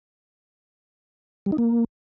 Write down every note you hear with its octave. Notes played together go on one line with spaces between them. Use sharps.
G3
D#4
A#3